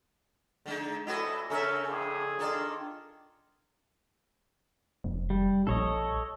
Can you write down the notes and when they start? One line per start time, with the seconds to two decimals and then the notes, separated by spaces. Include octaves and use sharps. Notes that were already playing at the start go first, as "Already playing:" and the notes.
0.66 D3 G#3 D#4
1.07 D2 A2 E3 E4 F#4 A4 D#5
1.50 C#3 C#4 A4 A#4 E5
1.87 F2 A2 G#4
2.39 D#3 D4 F4 A4 A#4 D5
5.04 F1
5.30 G3
5.67 A#1 A4 C#5 D#5